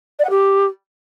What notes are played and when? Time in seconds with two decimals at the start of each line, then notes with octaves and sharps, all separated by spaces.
0.19 D5
0.25 F#5
0.30 G4